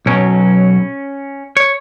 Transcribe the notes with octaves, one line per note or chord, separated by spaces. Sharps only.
B1 B2 F#3 C#4
C#5